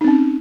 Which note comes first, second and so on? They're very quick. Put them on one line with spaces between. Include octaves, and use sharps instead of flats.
D#4 C4 C#4